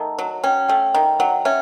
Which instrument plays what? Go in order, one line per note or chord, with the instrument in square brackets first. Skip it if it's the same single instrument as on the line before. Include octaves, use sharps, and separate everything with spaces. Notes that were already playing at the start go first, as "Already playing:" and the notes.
Already playing: [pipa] D#3 A3 [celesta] A5
[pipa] F#3
[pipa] C#4 [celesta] G5
[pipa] A3 [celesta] G5
[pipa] D#3 [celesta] G5
[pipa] F#3 [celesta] F#5
[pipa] C#4 [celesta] E5